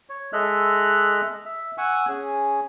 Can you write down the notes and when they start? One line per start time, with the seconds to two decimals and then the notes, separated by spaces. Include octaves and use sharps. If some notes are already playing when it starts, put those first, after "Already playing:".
0.09 C#5
0.33 G#3 A4 D#5 E5 F6 F#6
1.46 E5
1.78 F#5 G#5 C#6 E6
2.08 C#4 G#4